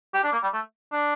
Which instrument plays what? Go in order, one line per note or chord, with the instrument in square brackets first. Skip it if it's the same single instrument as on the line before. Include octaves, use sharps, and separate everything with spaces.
[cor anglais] G4
D4
A#3
G3
A3
D4